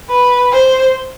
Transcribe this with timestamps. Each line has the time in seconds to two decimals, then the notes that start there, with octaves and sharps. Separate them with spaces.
0.09 B4
0.52 C5